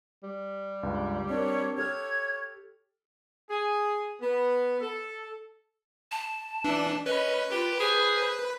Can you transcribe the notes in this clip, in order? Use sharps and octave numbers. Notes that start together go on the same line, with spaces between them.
G3
C#2 G2
C4 D4 A#4 C#5
G4 A4 C#5 F6 G#6
G#4
B3
A4
A5
E3 D4
C#4 B4 D#5
F4 G4
G#4 C5